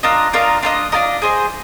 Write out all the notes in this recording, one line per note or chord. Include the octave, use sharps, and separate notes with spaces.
D4 F4 A#4 D#5
D4 F4 A#4 D#5
D4 F4 A#4 D#5
D4 F4 A#4 D#5
G#4 C5 D#5